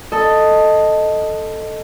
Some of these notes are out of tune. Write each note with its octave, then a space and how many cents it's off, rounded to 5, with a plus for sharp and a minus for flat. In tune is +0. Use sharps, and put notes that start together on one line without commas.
A4 +5 D#5 +0